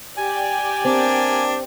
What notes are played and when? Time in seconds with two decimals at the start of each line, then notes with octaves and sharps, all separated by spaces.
0.17 G4 D5 G5 G#5
0.85 A#3 C4 D4